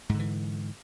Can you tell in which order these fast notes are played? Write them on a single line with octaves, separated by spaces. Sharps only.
G#2 D3 E3